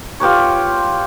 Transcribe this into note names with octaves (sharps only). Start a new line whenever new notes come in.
F4 G4 B4 C#5